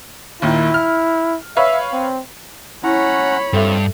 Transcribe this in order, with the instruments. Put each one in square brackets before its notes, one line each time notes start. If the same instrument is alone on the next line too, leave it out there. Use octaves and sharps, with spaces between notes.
[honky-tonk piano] D#2 A#2 D#3 [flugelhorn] E4
[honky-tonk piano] F6
[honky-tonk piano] B4 C#5 F5 [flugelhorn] E5
[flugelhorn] C4
[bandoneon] C#4 F#5 A#5 [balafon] E4 [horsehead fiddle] C#5 B5
[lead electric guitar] G2 [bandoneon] C4 F4 [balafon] A4 E5